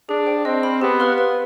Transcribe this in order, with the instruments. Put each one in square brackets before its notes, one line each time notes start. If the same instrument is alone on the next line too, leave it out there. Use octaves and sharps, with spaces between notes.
[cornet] D4 [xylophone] G#4
[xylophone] C5 G5
[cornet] C4 [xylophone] D#5
[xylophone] B5 F6
[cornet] B3 [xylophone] G4
[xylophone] B4 F5 C6 F6
B4